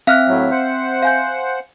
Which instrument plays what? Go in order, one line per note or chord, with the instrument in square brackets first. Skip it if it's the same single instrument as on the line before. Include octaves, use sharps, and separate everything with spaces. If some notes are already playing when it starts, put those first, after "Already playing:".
[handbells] C4 E5 [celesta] F5 F6 F#6
[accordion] A2 F#3
C5 F#5
[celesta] F5 G#5 G6